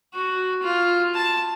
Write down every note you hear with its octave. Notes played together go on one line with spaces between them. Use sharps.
F#4
F4
A5